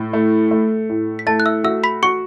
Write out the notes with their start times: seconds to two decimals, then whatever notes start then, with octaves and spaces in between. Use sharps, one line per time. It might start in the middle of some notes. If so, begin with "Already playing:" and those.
Already playing: A2
0.13 A3
0.51 A3
0.89 A2
1.19 B6
1.26 A3 A5 A6
1.40 F#6
1.46 E5 E6
1.64 F#4 E5 E6
1.83 B5 B6
2.03 F#4 C#6 C#7